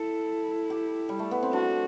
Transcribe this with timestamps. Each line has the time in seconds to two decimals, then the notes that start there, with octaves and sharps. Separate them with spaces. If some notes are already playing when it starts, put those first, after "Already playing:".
Already playing: E4 A4
0.70 G4
1.09 G3
1.19 A3
1.31 B3
1.43 C4
1.53 D4 F#4